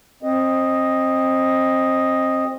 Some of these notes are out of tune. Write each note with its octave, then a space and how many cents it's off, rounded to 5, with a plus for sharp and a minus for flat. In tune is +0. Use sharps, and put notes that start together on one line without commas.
C4 +20 D#5 +0